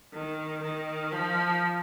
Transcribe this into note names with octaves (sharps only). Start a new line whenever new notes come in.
D#3
D#3
F3